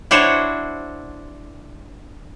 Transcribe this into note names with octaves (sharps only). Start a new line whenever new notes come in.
D4 E4 F#4 C5 C#5